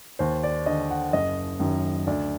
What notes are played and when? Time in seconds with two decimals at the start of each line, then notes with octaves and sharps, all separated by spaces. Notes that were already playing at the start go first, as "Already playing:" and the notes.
0.19 D#2 C5
0.43 D5
0.66 D3 D#5
0.90 F#5
1.13 F#1 D#5
1.60 F#2 D#3
2.07 D2 D5